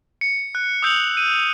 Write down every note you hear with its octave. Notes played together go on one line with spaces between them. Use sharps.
C#7
F#6
D#6 E6 G6 C#7 F7 F#7
D#7